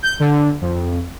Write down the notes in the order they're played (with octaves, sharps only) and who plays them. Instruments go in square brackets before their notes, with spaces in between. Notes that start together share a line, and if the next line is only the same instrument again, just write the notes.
[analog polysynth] G6
D3
F2